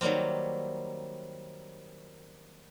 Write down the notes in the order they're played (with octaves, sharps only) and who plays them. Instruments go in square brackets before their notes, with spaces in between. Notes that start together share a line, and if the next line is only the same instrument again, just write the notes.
[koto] D#3 F#3 G3 A#3 C4